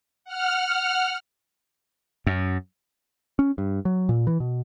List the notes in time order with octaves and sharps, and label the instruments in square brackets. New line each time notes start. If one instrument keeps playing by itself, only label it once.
[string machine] F#5 F6
[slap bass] F#2
[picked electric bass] C#4
G2
F#3
A#2
E3
B2